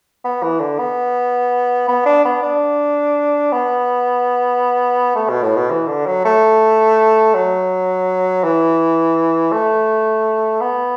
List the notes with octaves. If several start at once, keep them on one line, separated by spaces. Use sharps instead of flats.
B3
E3
D3
B3
B3
D4
B3
D4
B3
A3
B2
A2
B2
E3
D3
F#3
A3
F#3
E3
A3
B3